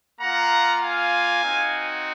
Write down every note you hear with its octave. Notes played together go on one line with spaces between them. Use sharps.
A#3 F4 F#5 A#5
F5 G#5
C4 D#4 F#4